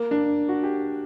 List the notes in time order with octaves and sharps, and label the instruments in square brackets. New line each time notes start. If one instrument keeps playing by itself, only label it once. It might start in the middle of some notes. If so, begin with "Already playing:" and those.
Already playing: [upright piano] A#3
D4
F#4
G4